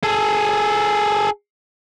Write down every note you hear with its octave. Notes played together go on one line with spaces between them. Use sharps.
G#4 A4